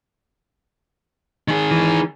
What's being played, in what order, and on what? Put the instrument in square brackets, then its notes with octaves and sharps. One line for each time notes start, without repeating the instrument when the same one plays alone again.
[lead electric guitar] D#3 G#4
[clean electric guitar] E3